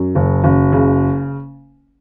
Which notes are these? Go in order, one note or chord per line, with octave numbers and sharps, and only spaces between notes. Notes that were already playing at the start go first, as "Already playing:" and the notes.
Already playing: F#2
F#1
F#1
C#3